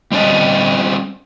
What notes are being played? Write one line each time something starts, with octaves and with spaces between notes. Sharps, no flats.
G3 C4 C#4 D5 D#5